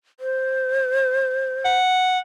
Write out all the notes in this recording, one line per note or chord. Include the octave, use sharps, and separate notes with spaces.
C5
F#5